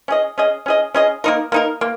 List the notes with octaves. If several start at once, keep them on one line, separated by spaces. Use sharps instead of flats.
C#4 G#4 D#5
C#4 G#4 D#5
C#4 G#4 D#5
C#4 G#4 D#5
A#3 D#4 A#4
A#3 D#4 A#4
A#3